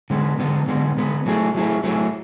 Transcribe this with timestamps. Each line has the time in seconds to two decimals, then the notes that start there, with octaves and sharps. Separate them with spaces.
0.10 D3 G#3 B3
0.39 D3 G#3 B3
0.68 D3 G#3 B3
0.97 D3 G#3 B3
1.26 F#3 A3 E4 G#4
1.55 F#3 A3 E4 G#4
1.84 F#3 A3 E4 G#4